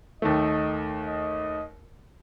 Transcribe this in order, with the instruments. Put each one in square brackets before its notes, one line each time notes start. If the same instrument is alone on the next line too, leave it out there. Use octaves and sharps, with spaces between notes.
[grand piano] D#2 D#3 A3 [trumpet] D#5
[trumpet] D#5